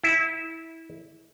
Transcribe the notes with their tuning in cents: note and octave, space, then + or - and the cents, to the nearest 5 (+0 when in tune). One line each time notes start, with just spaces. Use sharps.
E4 -20